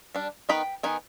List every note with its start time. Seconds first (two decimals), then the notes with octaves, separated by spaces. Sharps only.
0.15 G3 D4
0.49 D#3 B3 D#4 G5 B5
0.83 D#3 B3 D#4 G#5